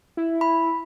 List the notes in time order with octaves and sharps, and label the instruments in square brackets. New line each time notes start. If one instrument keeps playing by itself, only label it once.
[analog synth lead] E4
[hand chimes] B5